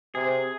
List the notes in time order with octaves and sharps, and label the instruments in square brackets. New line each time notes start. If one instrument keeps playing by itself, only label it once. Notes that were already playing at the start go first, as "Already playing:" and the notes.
[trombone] C3 [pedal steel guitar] G#4